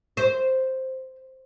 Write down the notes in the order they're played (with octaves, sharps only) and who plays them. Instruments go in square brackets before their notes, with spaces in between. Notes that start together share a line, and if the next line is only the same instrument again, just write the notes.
[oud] C5